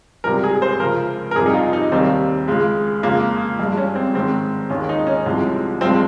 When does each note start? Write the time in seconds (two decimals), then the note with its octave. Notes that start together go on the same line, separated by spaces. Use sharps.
0.24 C#2 C3 G3 A#4
0.44 G#4
0.62 C5
0.80 C#2 C#3 F3 A#4
1.31 A#4
1.35 F2 C3 G3 G#4
1.46 D#4
1.54 F4
1.73 D#4
1.92 D#2 D#3 G3 C4
2.48 C#2 C#3 G#3
3.03 F2 C#3 G#3 A#3
3.59 G2 F3 G#3
3.77 C#4
3.95 C4
4.14 G#2 D#3 G#3 C4
4.70 D#2 D#3 G#3 C#4
4.89 D#4
5.07 C#4
5.26 C2 C3 F3 G#3
5.81 G2 F3 G#3 C4